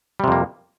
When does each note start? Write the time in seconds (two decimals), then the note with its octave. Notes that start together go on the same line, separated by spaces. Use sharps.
0.20 G3
0.24 C3
0.28 F2
0.32 A#3